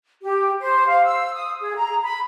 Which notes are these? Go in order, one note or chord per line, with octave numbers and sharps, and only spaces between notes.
G4
C5
F5
E6
D#6
G#4
A#5
B5